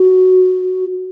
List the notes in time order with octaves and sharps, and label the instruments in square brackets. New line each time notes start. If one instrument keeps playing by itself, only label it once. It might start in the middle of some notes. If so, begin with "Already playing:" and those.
Already playing: [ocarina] F#4